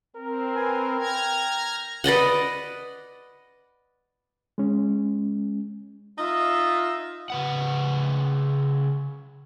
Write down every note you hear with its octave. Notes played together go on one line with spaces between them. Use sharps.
C4 A#4
B4 G#5
G5 A#5 F6 G#6
B4 D5 D#5 F#5
G#3 C#4
D#4 F4 D#5 E5
C#3 B4 F#5